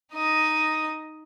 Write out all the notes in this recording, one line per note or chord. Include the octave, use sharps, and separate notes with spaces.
D#4 D#5